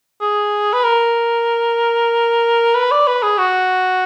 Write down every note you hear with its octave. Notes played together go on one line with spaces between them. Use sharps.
G#4
B4
A#4
B4
D5
B4
G#4
F#4